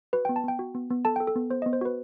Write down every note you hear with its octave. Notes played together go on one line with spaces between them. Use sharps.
F#4 B4
B3 G5
A5
B3 G5
F#4
B3
B3
A4 A5
A4 G5
A4
B3
B3 C5
B3 D#5
C5
F#4 B4